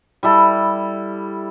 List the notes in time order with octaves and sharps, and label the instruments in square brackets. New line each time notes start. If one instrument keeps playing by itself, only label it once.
[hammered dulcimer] G3 E4 A4